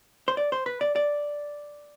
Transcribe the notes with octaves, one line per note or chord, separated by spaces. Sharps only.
C5
D5
C5
B4
D5
D5